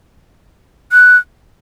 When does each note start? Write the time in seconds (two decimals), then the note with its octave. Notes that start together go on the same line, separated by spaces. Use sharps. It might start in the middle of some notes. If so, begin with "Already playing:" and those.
0.92 F#6